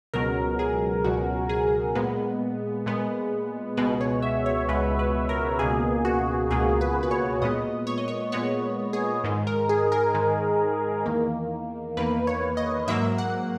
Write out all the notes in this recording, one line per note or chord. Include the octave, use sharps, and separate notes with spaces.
C#2 B2 F#3 A#4
G#4
C#2 B2 F#3 F#4
G#4
A#2 G#3 B3
A#2 G#3 B3
C#2 B2 G#3 B3 B4
C#5
E5
C#5
C#2 B2 G#3 B3 B4
B4
A#4
C#2 B2 A#3 G#4
F#4
C#2 B2 A#3 G#4
B4
B4
C#5
A#2 G#3 B3 D#5
C#5
D#5
C#5
A#2 G#3 B3 C#5
G#4
G#2 D#3 G#3
A#4
G#4
A#4
G#2 D#3 G#3
E2 D#3 A#3
E2 D#3 A#3 B4
C#5
D#5
G#2 F#3 A#3 E5
F#5